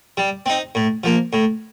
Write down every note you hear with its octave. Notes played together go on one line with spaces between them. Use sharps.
G3
C4 D#4
A2
F3 A#3
A2